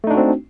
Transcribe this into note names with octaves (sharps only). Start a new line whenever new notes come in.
A3 C4 D4 D#4 F#4